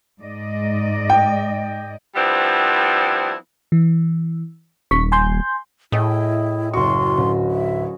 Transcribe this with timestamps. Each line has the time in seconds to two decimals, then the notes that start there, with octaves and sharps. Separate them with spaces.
0.22 G#2 D5 D#5
1.10 G5
2.15 F3 G3 B3 C4 D4 E4
3.72 E3
4.91 D#1 C#6 B6
5.12 G#5 C6 G6
5.92 A2 E4 G#4 D#5 G5
6.74 F#1 F#4 C6 C#6
7.17 D1 C#4
7.50 E5